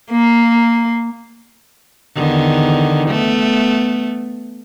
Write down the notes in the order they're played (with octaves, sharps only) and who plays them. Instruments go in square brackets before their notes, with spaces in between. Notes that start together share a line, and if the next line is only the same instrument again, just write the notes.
[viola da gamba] A#3
E2 D3 D#3
A3 B3